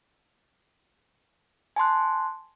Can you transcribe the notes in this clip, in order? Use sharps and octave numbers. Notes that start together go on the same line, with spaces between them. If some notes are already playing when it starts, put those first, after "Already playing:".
G#5 A5 C6 F#6